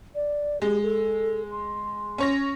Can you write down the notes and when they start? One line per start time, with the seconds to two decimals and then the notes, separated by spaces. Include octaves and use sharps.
0.15 D5
0.62 G#3 G4
0.83 A4
1.52 C6
2.18 C#4 C#5 A#6